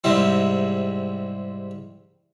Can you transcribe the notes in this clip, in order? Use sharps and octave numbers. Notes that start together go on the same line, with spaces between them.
G#2 C3 G3 E4